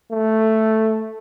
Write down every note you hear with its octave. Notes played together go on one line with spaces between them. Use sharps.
A3